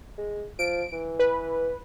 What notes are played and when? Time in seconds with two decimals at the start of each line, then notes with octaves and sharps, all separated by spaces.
0.18 G#3
0.59 F3 D7
0.93 E3
1.19 B4